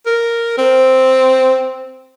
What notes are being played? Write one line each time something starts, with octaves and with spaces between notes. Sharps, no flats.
A#4
C4